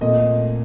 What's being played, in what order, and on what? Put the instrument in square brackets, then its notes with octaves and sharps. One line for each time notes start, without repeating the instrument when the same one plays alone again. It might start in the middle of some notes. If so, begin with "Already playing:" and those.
[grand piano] A#2 A3 C4 D#5